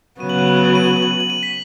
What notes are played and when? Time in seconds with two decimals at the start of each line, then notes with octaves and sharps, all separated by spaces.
0.20 C#3 F#3 B3 D#7
0.29 F#7
0.39 D#7
0.48 F#7
0.57 D#7
0.66 F#7
0.75 D#7
0.84 F#7
0.93 D#7
1.02 F#7
1.11 D#7
1.20 F#7
1.30 D#7
1.43 B6